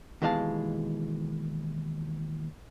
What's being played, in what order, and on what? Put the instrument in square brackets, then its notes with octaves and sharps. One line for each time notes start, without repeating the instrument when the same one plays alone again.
[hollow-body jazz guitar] D#2 B2 E3 G#3 F5 A5